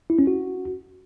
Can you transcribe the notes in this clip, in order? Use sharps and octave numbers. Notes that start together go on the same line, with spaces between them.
E4
C#4
F#4